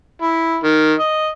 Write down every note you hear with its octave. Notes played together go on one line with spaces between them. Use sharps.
E4
D#3
D#5